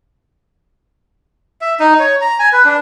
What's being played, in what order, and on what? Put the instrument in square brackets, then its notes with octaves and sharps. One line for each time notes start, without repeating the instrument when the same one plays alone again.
[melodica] E5
D#4
C#5
A#5
G#5
B4
D4